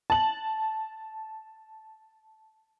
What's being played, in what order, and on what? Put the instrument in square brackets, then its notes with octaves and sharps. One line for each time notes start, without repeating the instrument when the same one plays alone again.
[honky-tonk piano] A5 F#7